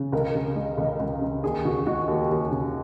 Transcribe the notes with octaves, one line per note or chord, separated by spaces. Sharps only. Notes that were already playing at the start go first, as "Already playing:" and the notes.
Already playing: C#3
C#2 A#4
C#3
G#3
C#2
C#2
C#3
D#2 G#4
C#3 F#4
G#3 F#4
D#2
D#2
C#3